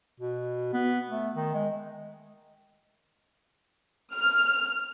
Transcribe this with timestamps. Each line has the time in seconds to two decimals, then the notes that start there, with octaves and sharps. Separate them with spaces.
0.20 B2
0.73 B3
1.08 A3
1.35 D#3
1.54 G#3
4.13 F6